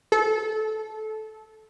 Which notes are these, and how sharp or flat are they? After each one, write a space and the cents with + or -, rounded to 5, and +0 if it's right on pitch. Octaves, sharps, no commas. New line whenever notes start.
A4 -20